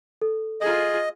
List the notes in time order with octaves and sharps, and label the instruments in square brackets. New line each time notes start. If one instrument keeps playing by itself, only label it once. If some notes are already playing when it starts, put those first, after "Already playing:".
[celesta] A4
[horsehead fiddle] F4 G#4 [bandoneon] D#5